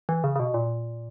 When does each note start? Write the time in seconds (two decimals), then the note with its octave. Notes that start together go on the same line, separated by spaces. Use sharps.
0.09 E3
0.24 C#3
0.36 C#3
0.40 B2
0.54 A#2